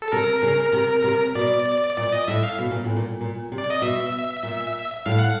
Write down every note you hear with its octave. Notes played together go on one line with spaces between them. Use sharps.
A4
C3 A#4
C#3
C3
C3
B2 D5
A#2 D5
D#5
A2 E5
F5
B2
A#2
A2
A#2
A#2
C3
D5
D#5
B2 E5
A#2
A2 F5
F#5